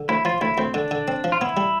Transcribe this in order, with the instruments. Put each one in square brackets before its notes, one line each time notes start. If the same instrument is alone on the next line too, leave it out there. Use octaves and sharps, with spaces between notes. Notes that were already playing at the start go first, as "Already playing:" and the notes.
Already playing: [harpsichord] D3
[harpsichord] D2 [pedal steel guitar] E4
[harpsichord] F3 [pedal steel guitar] F4
[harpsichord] D2 [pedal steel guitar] E4
[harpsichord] D2 [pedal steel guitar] C4
[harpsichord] D3 [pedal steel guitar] D4
[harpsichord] D3
C4
F3
[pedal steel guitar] F4
[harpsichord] B3 [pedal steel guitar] E4
[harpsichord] G3